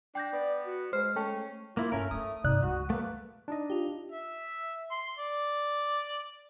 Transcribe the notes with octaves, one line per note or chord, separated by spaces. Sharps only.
D4 G5 G6 A#6
B3 D5
F#4
G#3 C5 F6
A3 C#4 G5
A#3 E4 F4
G2 A3 C#4 A#4
A3 C#4 D#6
G2 C3 D#4 D5 F#6
C#2 G3 F#4
A3 A#3 B4
D4 D#4 D#5
F4 G4
E5
C6
D5